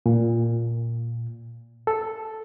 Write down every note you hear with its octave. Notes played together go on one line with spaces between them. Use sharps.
A#2
A4